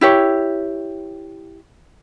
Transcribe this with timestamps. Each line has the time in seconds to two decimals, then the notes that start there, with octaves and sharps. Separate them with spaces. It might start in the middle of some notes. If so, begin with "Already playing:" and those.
0.01 E4 G4 C#5